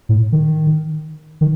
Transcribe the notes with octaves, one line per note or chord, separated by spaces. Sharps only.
A2
D#3
D#3